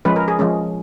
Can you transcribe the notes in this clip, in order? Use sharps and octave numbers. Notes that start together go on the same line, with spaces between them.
F3 G#3 C#4 B4
A#4
G#4
F3 G#3 C#4